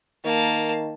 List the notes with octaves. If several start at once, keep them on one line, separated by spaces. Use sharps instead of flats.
D#3 A#3 A5